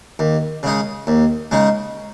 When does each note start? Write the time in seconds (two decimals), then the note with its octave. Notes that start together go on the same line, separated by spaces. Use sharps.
0.19 D#2
0.63 C#3 G#3 D#4
1.07 D#2
1.51 C#3 G#3 D#4